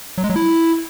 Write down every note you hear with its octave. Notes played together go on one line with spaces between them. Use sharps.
F#3
G#3
F#3
E4